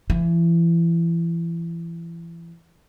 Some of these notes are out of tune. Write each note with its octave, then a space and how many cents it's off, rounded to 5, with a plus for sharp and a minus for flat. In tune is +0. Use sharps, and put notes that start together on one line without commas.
E3 +30